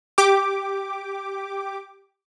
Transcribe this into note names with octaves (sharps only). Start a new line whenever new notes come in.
G4 D6